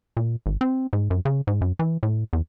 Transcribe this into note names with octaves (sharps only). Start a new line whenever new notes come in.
A#2
G#1
C4
G#2
F#2
C#3
G#2
F#2
E3
A2
E2